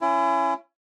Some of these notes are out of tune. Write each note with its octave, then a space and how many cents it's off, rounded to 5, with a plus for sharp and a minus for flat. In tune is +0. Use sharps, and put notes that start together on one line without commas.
C#4 +0 E4 +35